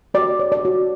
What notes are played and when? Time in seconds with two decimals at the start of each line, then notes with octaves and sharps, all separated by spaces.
0.14 F#4 D5
0.39 C#5
0.52 D5
0.65 F#4